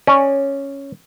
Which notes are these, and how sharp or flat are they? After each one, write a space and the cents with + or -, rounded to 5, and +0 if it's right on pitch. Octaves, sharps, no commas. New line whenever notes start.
C#4 +0 D5 +20